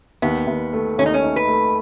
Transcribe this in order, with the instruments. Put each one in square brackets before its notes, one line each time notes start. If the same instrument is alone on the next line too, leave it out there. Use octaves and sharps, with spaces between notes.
[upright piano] D#2 [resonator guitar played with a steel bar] B3
[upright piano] D#2
A3
[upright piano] D#2 [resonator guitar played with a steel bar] C#4
[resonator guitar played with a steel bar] D#4
C#4
[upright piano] D#4
[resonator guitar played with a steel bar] B4
[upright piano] A3